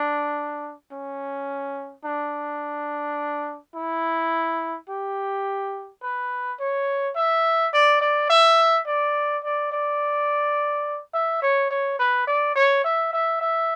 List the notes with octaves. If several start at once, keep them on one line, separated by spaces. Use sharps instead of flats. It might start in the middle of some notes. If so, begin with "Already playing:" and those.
Already playing: D4
C#4
D4
E4
G4
B4
C#5
E5
D5
D5
E5
D5
D5
D5
E5
C#5
C#5
B4
D5
C#5
E5
E5
E5